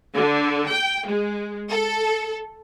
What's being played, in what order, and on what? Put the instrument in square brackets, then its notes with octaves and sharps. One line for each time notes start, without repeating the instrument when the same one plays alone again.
[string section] D3
G5
G#3
A4